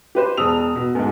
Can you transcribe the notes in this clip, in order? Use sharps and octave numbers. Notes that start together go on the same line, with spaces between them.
G4 B4 C5
E1 A5 D#6 E6 F7
B2
D2 G#2